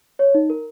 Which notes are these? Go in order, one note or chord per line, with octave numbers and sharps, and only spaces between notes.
C#5
D#4
A#4